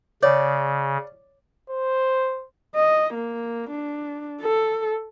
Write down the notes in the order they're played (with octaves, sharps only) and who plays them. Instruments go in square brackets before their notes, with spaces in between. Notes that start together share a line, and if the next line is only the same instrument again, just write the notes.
[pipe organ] C#3 [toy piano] C#5 [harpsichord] D5
[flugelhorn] C5
[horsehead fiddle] D#5
A#3
D4
A4